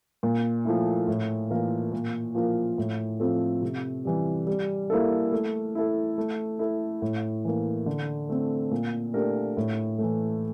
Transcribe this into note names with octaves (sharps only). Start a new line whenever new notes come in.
A#2
F3 A3 E4
A2
E3 A#3 F4 A#4
A#2
F3 A#3 F4 A#4
A2
F3 C4 F4 A4
C3
E3 G3
G3
A#3 E4 A4
A3
E4 A4
A3
E4 A4
A2
E3 A#3
D3
A3 C4
A#2
A3 D4 G4 A#4
A2
E3 A3